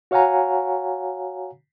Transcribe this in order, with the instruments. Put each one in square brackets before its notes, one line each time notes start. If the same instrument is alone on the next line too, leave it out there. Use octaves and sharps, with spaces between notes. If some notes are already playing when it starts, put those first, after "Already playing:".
[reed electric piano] F#4 C#5 F5 F#5 G#5 A#5